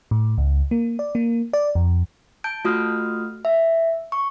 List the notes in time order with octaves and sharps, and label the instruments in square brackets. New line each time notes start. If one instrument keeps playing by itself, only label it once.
[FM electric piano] A2
C#2
A#3
D5
A#3
D5
F2
[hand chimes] A5 G6 D7
A3 F4 F#4 D#6 F6
E5
C#6